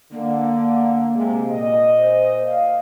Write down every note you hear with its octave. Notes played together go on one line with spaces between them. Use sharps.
D3 A#3
C3 G#3
A#2 D#5
C5
F5